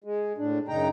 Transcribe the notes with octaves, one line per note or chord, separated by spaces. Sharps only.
G#3
A2 D4
F#2 C#3 D#4 G5 A#5